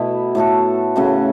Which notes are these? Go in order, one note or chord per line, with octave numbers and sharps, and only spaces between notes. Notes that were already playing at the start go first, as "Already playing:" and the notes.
Already playing: B2 A3 B3 E4
A2 A3 F#4 A4
C#3 A3 C#4 F#4